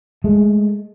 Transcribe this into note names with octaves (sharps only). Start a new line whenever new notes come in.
G#3 A3